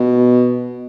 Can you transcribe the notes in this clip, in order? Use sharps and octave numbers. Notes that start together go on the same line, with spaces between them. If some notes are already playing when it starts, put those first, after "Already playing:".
Already playing: B2